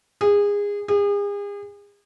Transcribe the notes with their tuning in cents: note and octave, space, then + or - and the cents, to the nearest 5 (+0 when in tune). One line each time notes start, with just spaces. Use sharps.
G#4 -25
G#4 -40